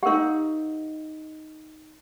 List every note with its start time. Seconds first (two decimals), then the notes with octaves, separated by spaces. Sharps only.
0.03 D#4 G4 A#4 F5 F#5